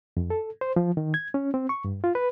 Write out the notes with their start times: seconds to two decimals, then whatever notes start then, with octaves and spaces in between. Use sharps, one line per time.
0.17 F2
0.30 A4
0.61 C5
0.76 F3
0.97 D#3
1.14 G#6
1.34 C#4
1.54 C4
1.69 C#6
1.84 G2
2.04 F4
2.15 B4